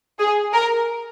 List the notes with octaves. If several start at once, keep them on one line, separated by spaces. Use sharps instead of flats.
G#4
A#4